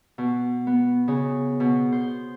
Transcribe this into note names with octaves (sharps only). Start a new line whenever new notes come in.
B2
B3
C#3
B2
C5